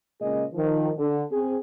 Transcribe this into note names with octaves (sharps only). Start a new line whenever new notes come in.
A#2 C#3 G#3 G#4 D#5
D#3 F3
D3
C4 G#4